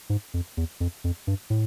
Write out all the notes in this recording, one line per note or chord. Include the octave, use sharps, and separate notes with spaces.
G#2
F2
E2
F2
F2
G2
A2